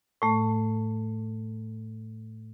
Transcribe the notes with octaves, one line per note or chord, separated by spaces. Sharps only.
A2 A3